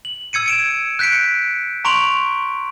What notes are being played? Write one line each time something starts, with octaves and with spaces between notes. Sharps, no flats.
F#7
E6 G#6 C#7 D#7
G#6 D7 E7
F#6 G6 B6 C#7 D7
A#5 C6 C#6 D7 F7 F#7